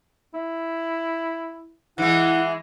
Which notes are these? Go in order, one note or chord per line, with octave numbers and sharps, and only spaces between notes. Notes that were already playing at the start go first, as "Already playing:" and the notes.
E4
E3 G#3 E4 F#5